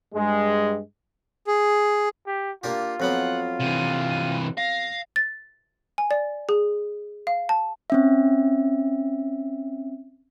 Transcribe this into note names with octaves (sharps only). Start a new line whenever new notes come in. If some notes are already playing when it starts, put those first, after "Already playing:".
G2 G#3
G#4
G4
A#3 D4 F4 G4
F2 F#3 B3 F#5
C3 E3 D#7
D#7
F5 A#6
A6
G#5
D5
G#4
F5
A5
C4 C#4 E5